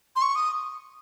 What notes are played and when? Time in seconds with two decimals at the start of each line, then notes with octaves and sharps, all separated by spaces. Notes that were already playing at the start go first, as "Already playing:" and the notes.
0.16 C6
0.22 C#6
0.35 D#6